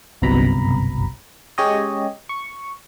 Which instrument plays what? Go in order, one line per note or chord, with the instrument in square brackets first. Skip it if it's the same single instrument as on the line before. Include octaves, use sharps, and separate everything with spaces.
[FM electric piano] G1 C2 F#2 B2 A#5 B5
G#3 C#4 G4 C#5 D#5
C#6